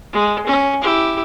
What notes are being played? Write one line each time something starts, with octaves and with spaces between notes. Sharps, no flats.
G#3
C#4
E4 G4